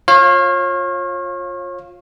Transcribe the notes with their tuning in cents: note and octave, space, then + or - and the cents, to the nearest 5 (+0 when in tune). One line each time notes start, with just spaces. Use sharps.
F4 +15 C#5 -35 F5 +0